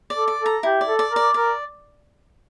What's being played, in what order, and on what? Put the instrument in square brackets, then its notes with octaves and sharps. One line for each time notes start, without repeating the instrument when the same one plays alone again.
[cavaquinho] D5
[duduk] A4
[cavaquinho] D5
[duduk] A4
[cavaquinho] A#5
[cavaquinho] E4 [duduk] G4
[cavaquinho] D5
[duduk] A4
[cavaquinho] D5
[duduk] A#4
[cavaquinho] D5
[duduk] A#4 [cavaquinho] D5